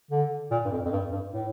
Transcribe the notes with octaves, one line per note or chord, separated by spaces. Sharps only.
D3
A#2
G2
F2
F2
G2
G2
A2